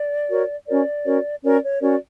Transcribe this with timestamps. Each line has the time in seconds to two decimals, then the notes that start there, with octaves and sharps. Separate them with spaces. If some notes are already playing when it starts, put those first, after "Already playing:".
Already playing: D5
0.29 F#4 A#4 C#5
0.67 C#4 F#4 A#4 C#5 D5
1.04 C#4 F#4 A#4 C#5
1.43 C#4 F#4 A#4 C#5 D5
1.62 C#5
1.81 C#4 F#4 A#4 C#5 D5